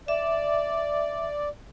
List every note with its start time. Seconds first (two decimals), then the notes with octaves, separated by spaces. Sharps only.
0.08 D5 E5